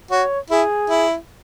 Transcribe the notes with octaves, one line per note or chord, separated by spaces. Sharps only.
F#4 C#5
E4 G#4
E4